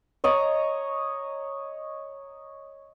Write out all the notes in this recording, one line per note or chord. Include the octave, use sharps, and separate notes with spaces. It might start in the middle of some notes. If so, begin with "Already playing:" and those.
C#5 D#5 A#5